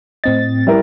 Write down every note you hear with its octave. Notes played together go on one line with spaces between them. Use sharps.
A2 C4 D#5 A6
G3 E4 A#4